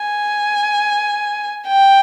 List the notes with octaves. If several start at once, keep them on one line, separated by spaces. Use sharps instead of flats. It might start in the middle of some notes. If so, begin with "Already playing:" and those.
Already playing: G#5
G5